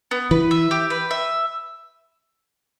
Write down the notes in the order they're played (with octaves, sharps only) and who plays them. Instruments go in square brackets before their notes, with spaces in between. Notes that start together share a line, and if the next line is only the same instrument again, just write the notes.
[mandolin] B3
[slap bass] E3 [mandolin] B4
[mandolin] E5
G4
B4
E5